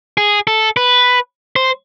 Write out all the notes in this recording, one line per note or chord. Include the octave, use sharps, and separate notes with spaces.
G#4
A4
B4
C5